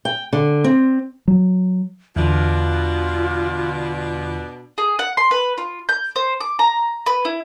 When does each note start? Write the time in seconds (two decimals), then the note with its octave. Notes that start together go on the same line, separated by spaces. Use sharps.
0.05 G5
0.33 D3
0.64 C4
1.28 F#3
2.16 E2 B2 D3 D4 F4
4.78 G#4
4.99 F#5
5.17 C6
5.31 B4
5.58 F4
5.89 G6
6.16 C5
6.41 D6
6.59 A#5
7.06 B4
7.25 E4